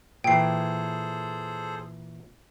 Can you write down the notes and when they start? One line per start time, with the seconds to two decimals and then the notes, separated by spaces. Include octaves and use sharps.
0.24 A#2 E3 G#4 A4 C5 G5 C7